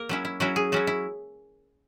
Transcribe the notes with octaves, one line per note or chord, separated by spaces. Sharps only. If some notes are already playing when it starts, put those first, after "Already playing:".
Already playing: A#3 A#4
F#3 C#4 E4
E4
F#3 C#4 E4 F#4
G#4
F#3 C#4 E4 F#4
E4